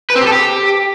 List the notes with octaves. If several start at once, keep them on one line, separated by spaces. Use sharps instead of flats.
B4
C4
G4
A4
G4